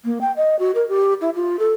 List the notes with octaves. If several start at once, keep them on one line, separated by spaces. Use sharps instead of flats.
A#3
G5
D#5
F#4
A#4
G4
E4
F4
A4